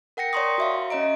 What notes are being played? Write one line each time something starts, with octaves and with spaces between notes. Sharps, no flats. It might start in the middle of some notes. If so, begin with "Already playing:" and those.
A#4 F#5 G5 A#6 C#7
C#5 D5 A#5 C6 C#6 D#6
F#4 E5 F5
C#4 C#5 D#5 A#5 D7